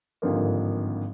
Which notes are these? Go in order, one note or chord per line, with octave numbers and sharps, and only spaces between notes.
G#1 G2 D3 F3 A#3